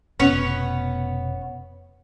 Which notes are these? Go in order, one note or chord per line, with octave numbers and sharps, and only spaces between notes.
F1 B2 B3 C#4 B4